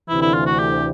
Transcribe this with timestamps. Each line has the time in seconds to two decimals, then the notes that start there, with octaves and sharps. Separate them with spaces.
0.09 D2 C3 E3 E4
0.22 E4
0.34 F4
0.46 F#4
0.60 G4